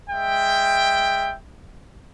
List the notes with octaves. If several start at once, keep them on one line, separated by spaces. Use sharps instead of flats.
G#3 E5 G5